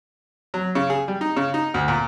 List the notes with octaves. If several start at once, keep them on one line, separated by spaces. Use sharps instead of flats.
F#3
C#3
G#4
G3
D#4
C#3
D#4
D2
A#2